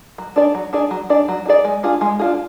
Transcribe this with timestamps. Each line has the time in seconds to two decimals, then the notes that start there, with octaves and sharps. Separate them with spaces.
0.18 F#3
0.36 D4 G#4 D5
0.55 F#3
0.73 D4 G#4 D5
0.91 F#3
1.10 D4 G#4 D5
1.28 F#3
1.46 D4
1.48 G#4 D5
1.65 G#3
1.83 D4 F4 G#4
2.01 G#3
2.19 D4 F4 G#4